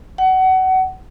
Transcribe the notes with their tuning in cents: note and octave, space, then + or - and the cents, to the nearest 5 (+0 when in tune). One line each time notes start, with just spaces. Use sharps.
F#5 +25